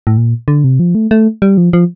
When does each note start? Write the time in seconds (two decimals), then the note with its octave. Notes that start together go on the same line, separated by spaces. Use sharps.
0.07 A2
0.17 A#2
0.48 D3
0.64 C3
0.80 F3
0.95 A3
1.11 A3
1.42 G3
1.58 F3
1.73 F3